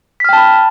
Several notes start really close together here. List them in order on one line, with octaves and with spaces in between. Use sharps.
B6 F6 G5 A5 B5